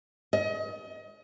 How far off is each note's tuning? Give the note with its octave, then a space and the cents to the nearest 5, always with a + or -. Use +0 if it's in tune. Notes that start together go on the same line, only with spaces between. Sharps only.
D#5 +30